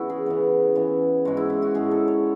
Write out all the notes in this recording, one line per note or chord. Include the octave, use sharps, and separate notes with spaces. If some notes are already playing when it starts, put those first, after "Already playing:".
Already playing: C#3 E3 B3 E4 F#4
G#4
C#3 E3 B3
C#3 E3 B3
G#2 G#3 C#4 F#4
E4
E4
F#4
G#2 G#3 C#4 G#4
A4
C#5